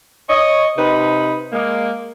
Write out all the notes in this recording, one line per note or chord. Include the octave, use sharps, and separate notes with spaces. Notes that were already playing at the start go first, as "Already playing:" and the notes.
C#5 D#5
C3 D#4 B4 B5
G#3 A#3